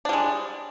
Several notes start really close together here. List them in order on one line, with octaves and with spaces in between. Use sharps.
D4 G3 G#3